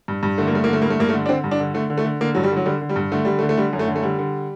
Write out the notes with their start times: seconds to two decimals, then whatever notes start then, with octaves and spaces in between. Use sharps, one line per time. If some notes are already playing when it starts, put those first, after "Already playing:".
0.08 G2
0.23 G2
0.38 D3 A3
0.47 A#3
0.53 G2 A3
0.64 A#3
0.68 D3
0.73 A3
0.82 G2 A#3
0.90 A3
0.99 G2 A#3
1.09 A3
1.14 D3
1.26 D4
1.29 D3 C4
1.44 G2
1.51 D4
1.60 D3
1.74 D3 A3
1.90 D3
1.98 A3
2.05 D3
2.21 D3 A#3
2.35 G2 F#3
2.43 G3
2.51 D3
2.57 F#3
2.66 D3 G3
2.81 D3
2.89 G3
2.96 G2
3.12 D3 A3
3.25 D3 G3
3.39 A3
3.42 D3
3.49 A3
3.57 D3 G3
3.73 F#2
3.79 A3
3.88 D3
3.96 A3
4.03 D3 G3
4.19 D3